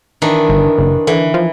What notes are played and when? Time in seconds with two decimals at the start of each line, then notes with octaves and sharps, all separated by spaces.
0.22 D#3 E3 D4
0.49 G1
0.78 F#1
1.07 D3 E3
1.34 F3